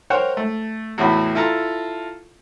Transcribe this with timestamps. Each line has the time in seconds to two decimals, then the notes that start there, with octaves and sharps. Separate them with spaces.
0.10 A#4 C5 C#5 F#5 G5
0.37 A3
0.98 E2 A2 E4 F#4 B5
1.35 E4 F4 A4 A5 A#5